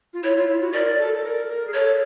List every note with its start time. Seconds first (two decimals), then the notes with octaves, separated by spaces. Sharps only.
0.14 F4
0.23 E4 C#5
0.36 F4
0.48 E4
0.61 F#4
0.73 A#4 D5
0.99 A4
1.14 A4
1.24 A#4
1.49 A#4
1.68 G#4
1.74 A4 C#5